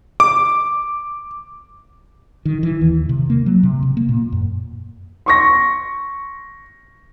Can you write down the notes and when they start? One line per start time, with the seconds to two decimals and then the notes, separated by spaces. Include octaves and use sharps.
0.20 D6
2.45 D#3
2.63 E3
2.81 D#2
3.09 C3
3.30 A#3
3.46 F#3
3.63 C3
3.82 C3
3.97 A#3
4.09 A#2
4.32 F#2
5.26 C6 C#6 A#6